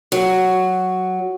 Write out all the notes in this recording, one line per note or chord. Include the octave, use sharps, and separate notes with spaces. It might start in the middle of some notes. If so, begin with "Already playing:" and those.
F#3